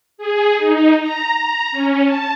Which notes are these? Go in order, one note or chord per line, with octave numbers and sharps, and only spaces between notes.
G#4
D#4
A#5
A#5
C#4
A5